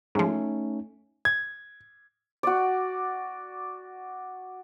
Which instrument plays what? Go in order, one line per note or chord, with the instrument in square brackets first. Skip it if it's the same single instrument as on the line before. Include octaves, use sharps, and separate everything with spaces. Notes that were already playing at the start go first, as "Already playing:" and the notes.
[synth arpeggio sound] G#2 F3 [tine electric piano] A3 C#4 D#4
[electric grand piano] G#6
[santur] F#4 D5